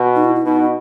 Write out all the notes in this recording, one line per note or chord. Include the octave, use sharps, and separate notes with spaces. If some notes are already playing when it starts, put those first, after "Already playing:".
Already playing: B2
D#4
E4
E4
B2 D#4